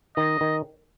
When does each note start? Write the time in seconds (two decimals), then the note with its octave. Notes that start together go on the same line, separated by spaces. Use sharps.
0.17 D#3 D#5
0.41 D#3